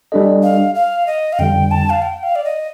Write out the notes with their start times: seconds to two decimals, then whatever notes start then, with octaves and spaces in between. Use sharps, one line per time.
0.12 G3 D4 A4 D#5
0.43 F5
0.75 F5
1.07 D#5
1.33 F5
1.39 F2 D3 G3 G5
1.71 A5
1.90 F5
2.02 G5
2.23 F5
2.36 D5
2.45 D#5